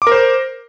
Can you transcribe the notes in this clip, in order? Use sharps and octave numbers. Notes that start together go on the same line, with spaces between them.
A#4 C5 D6